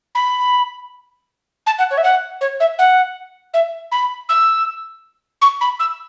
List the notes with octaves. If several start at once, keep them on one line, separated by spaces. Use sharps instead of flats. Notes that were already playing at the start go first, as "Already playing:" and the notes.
B5
A5
F#5
C#5
E5
F#5
C#5
E5
F#5
E5
B5
E6
C#6
B5
E6